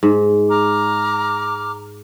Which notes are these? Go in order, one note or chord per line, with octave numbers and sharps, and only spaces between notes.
G#2
A#5 D6 F6